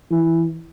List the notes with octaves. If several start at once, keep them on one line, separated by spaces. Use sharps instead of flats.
E3